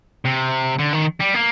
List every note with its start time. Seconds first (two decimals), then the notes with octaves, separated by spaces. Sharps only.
0.25 C3
0.79 D3
0.94 D#3
1.21 G3
1.35 A#3